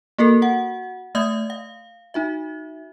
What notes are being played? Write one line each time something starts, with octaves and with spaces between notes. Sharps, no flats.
A#3 F#4 A4 A#4
F#4 F#5
A3 D#5 E5 D#6 G6 G#6
F5
D#4 F#4 E5